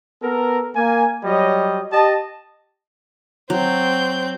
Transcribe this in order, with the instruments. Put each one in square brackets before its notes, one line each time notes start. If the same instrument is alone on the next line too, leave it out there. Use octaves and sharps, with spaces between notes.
[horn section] B3 A4 A#4
A#3 G#5
F#3 G3 C#5 D#5
G4 D#5 A5
[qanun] F#3 [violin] C4 G6